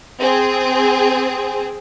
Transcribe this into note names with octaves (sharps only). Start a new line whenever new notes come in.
C4 G#4